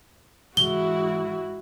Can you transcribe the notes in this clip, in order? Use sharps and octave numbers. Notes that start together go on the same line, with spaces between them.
G#2 E3 G#3 E4 F#4 G7